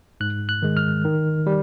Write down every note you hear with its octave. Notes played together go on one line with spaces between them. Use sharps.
G#2 F#6
F#6
D#3 G#3
F6
D#3
G3